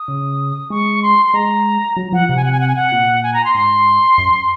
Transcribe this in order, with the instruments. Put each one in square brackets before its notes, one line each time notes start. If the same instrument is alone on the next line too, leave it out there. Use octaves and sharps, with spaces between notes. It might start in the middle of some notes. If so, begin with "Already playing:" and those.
Already playing: [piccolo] D#6
[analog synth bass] C#3
[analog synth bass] G#3 [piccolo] C#6
[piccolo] C6
C6
[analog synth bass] G#3 [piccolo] A#5
[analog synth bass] F#3
[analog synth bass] F3 [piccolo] F#5
[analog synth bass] C3 [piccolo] F#5
[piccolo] G#5
F#5
G#5
F#5
G#5
F#5
[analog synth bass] A#2
[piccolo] G#5
A#5
C6
[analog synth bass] G#2 [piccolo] C6
[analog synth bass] F#2